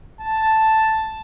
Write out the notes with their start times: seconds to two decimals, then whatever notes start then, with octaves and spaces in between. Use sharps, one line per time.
0.21 A5